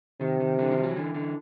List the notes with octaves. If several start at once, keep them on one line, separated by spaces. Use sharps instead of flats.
C3 D#3
D#3
D3 E3
D#3 F3
E3 F#3
D3 E3
D3 E3